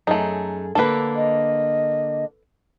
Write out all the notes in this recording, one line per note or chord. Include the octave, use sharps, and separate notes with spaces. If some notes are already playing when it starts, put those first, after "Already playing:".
F#2 A3 D#4 G#4 A4
D3 A#3 D4 A4 B4
D#5